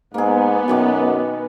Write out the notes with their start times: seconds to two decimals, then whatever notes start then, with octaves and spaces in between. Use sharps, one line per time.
0.14 G#2 A#3 B3 G#4
0.68 F#2 B2 D#3 D6